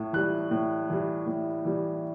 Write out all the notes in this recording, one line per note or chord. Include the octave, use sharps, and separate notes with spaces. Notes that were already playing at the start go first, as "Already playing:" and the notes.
Already playing: A2
E3 G3 F#6
A2
E3 G3
A2
E3 G3